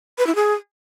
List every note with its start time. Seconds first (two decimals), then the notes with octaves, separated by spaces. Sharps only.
0.18 B4
0.27 E4
0.35 G#4